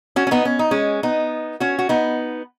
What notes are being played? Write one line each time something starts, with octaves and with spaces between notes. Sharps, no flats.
C#4 F#4
C#4
B3 D#4
C#4
D#4
G#3 C#4
B3 D#4
C#4 F#4
F#4
B3 D#4